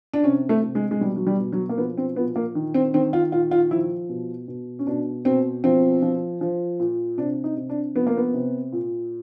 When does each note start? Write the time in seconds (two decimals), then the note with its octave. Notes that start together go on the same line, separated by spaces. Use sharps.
0.14 D4
0.24 C3 C#4
0.49 A3
0.63 C3
0.75 G#3
0.91 G#3
1.01 B2 G3
1.16 F#3
1.27 G3
1.40 B2
1.52 F#3
1.69 A#3
1.78 F3 B3
1.98 C4
2.16 A#2 B3
2.36 A#3
2.55 D#3
2.74 C4
2.94 D#3 C4
3.13 F4
3.32 A#2 F4
3.51 F4
3.71 F3 E4
4.09 B2
4.48 B2
4.79 C#4
4.87 B2 D4
5.25 B2 C4
5.64 F3 C4
6.02 F3
6.41 F3
6.80 A#2
7.18 C3 D4
7.44 D#4
7.57 C3
7.70 D4
7.95 F3 B3
8.07 A#3
8.17 B3
8.34 C3
8.72 A#2